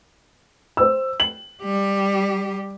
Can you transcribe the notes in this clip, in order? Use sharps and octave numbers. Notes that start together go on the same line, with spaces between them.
C5 E6
F#7
G3 G4